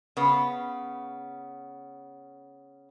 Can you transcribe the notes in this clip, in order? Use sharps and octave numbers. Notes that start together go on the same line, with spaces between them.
C#3 B3